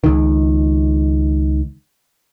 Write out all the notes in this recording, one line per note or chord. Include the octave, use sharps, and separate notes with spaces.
C#2 D#3